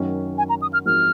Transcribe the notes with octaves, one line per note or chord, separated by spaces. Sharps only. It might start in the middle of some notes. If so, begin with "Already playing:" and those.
Already playing: F#2 D#3 F#3 C#4
G#5
A#5
D#6
F6
G#2 F3 C4 F#4 A#4 F6